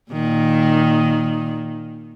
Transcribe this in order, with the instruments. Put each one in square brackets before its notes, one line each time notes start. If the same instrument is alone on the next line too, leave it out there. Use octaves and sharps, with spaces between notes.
[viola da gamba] A#2 D#3